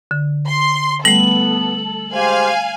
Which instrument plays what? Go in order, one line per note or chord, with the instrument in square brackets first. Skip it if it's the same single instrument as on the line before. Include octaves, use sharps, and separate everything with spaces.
[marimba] D3
[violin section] C6
[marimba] G3 A3 [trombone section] B3 [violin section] A4 [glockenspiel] F#7
[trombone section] G#3 G4 C5 [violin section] F5 G#5